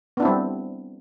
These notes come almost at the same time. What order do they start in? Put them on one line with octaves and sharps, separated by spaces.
B3 D4 E4 C4 G3